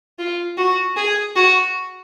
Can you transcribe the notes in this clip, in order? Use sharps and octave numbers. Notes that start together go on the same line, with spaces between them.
F4
F#4
G#4
F#4